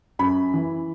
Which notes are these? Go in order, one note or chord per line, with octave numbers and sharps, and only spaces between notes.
F#2 B5
E3